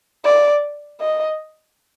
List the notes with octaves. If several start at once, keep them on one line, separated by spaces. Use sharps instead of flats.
D5
D#5